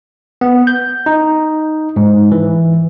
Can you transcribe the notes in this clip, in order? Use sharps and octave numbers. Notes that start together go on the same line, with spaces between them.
B3
G6
D#4
G#2
E3